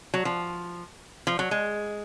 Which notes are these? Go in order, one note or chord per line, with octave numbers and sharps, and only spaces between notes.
F#3
F3
F3
F#3
G#3